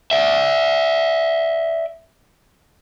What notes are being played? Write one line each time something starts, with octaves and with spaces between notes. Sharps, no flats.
D5 E5